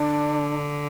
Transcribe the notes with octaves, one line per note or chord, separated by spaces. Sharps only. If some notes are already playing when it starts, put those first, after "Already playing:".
Already playing: D3 D4